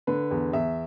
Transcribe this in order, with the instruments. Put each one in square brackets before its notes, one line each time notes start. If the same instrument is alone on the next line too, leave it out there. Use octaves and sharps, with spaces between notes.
[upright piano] D3 B4
E2
E2 E5